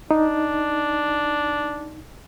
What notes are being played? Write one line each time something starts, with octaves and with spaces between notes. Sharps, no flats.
D4 D#4